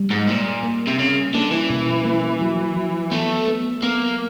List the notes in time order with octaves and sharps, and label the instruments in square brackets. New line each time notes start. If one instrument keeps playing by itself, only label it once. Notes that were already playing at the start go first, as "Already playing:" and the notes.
Already playing: [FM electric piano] G3
[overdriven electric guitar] G#2
[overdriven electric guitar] A#2 [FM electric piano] A#3
[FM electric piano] A#3
[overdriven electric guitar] C3
[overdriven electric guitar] C#3 [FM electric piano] C#4
[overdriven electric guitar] D3 [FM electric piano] A#3
[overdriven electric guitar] E3
[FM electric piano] B2
A#3
F#3
F#3
[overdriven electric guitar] A3 [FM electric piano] B3
[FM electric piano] B3
[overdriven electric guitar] A#3 [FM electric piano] B3